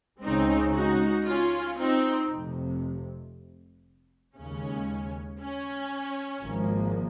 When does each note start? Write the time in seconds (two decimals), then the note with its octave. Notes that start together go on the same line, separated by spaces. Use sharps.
0.22 C#2 C#3 G#3 C4 C#4 D#4
0.74 D#4 F#4
1.26 C#4 F4
1.77 C4 D#4
2.29 F1 F2 C3
4.36 D#2 C#3 G#3 C#4
5.39 C#4
6.43 G#1 G#2 F3 A#3